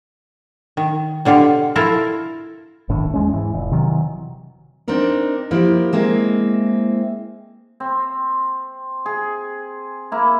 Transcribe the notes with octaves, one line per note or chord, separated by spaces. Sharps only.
D#3
B2 D3 F4 G4
E4 F4 A4 A#4
G1 A2 D#3 D4
E2 G#3 C#4
G#2 E3
F1
C3 D#3 E3 F#3
C4 D4 D#4 A#4 D5
F3 A#3 E4 G4 A#4 D5
G#3 A#3 C4 E4
C4
G#4
A#3 E4